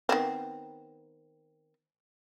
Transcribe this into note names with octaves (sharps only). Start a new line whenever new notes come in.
D#3 B3 C4